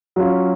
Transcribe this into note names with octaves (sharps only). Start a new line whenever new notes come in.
F#3 C#4 F4